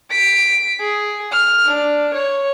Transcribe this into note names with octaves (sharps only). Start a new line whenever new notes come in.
B6 D7
G#4
F6
D4
C#5